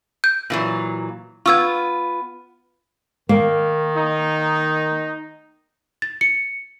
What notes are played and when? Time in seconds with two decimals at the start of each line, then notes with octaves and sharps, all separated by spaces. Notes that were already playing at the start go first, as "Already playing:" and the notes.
0.24 G6
0.50 A#2 E3 F#3
1.46 B3 F4 C#6 E6 G#6
3.29 D#3 A#3
3.96 D#4
6.02 A6
6.21 C#7